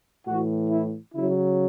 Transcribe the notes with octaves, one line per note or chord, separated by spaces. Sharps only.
A2 E3 F#4
E4
C#3 F#3 E4